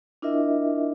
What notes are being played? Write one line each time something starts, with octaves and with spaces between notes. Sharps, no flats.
D4 E4 F4 A#4 D#5 E5